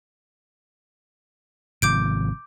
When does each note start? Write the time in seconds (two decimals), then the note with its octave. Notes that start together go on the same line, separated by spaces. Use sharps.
1.82 G#1 C3 F3 D6 G6 D7